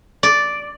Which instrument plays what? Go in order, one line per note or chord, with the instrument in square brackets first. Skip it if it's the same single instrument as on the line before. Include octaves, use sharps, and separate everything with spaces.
[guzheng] D5